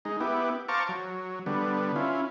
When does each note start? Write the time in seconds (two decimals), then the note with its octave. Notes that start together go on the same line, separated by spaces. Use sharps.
0.05 G#3 D#4
0.20 B3 E4 G4
0.69 C5 F5 A5 A#5 C#6 D6
0.89 F#3
1.46 D3 G3 B3
1.96 C#4 E4 F4